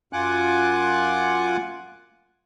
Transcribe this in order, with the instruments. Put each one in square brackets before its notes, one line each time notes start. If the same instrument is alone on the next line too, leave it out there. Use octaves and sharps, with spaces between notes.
[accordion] F#2 F4 F#5 G#5 D6 F#6